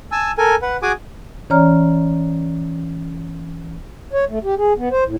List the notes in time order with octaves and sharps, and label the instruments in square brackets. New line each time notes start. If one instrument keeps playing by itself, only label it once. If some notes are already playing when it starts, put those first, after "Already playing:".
[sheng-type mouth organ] G#5 A5 E6
A4 A#4 G#5
B4 F#5
F#4 G#4 G#5 D6 D#6
[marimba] E3 C#4 C#5 D5 A#5 F6
[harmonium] C#5
A3
G4
G#4
B3
C5
A2